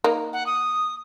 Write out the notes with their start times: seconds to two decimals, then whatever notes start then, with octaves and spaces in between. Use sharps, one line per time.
0.04 A#3 D#4
0.33 F#5
0.46 D#6